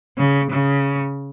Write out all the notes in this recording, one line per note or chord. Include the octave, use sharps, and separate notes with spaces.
C#3
C#3